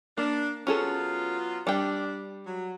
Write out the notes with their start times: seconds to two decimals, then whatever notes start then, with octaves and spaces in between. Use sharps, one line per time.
0.18 A#3 D4
0.67 F#3 B3 C#4 F4 G#4 A4
1.67 G3 D4 G5
2.46 F#3